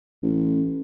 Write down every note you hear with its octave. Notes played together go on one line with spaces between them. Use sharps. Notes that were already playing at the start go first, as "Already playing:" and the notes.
A1